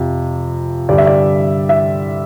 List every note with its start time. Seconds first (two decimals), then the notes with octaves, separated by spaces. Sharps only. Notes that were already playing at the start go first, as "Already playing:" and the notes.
Already playing: F2 C3 F3
0.89 G2 D3 G3 D5
0.98 E5
1.07 D5
1.69 E5